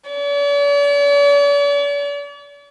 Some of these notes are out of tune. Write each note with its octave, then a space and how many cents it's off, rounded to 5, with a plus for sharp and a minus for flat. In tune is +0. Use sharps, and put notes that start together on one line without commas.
D5 -45